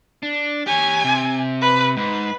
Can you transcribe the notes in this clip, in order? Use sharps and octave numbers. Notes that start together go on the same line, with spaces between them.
D4
G4 C#5 G#5
C3
B4
G#2 B4